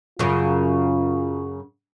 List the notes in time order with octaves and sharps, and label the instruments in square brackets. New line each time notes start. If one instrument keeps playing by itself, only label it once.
[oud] F#2 C#3 [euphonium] F4